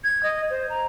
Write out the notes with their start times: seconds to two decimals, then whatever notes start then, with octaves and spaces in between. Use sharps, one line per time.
0.04 G#6
0.23 D#5
0.50 C5
0.70 A#5